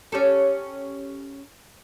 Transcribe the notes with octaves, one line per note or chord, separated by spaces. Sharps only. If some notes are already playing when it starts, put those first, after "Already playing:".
C#4 G4 A4